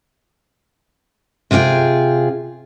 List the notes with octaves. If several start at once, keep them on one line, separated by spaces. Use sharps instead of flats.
C3 F4 G#4 C#5 G5